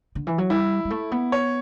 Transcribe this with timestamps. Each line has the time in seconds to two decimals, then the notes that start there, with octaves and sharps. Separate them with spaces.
0.15 D3
0.27 E3
0.38 F#3
0.50 G3 E4
0.85 G3
0.90 A3
1.12 B3
1.32 C#5